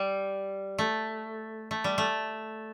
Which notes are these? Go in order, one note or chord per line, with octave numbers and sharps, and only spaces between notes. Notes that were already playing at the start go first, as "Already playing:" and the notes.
Already playing: G3
A3
A3
G3
A3